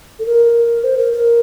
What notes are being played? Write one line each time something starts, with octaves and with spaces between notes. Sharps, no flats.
A4
A#4
C5
A#4
A#4